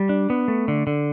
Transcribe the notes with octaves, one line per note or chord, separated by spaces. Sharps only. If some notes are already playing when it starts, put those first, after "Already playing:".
Already playing: G3
D4
B3
A3
D3
D3